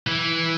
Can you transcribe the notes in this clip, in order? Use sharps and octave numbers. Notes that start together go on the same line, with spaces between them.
E3